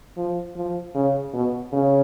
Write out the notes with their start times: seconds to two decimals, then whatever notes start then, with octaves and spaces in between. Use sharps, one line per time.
0.17 F3
0.56 F3
0.95 C#3
1.33 B2
1.72 C#3